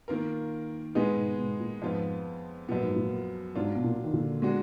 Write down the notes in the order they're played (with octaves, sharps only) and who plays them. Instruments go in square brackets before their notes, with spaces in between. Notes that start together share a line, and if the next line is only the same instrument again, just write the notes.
[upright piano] D#3 A#3 F4 A#4
[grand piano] A#2 [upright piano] G#3 B3 D#4 G#4
[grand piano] G#2 B2
G#2 B2
A#2
[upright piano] F2 F3 B3 F4 [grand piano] G#2
[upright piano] F#2 F3 B3 [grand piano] A#2
[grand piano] G#2
A#2
[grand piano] G#2 [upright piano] F#3 D4 F4
[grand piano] B2
A#2
D#3
A#2 D3
[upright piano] G#3 D4 F#4